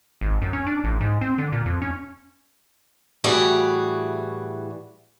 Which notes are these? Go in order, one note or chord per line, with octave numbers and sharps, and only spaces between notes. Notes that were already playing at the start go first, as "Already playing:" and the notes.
G#1
F#2
C#4
D4
A1
G#2
C4
D3
A#2
F2
C#4
A2 E3 G3 F#4 G#4